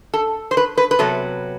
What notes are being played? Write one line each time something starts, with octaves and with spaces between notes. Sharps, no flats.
A4
C5
B4
B4
B4
C3 F#3 B3 A4